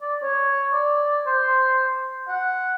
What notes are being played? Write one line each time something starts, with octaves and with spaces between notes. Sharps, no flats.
D5
C#5
D5
C5
F#5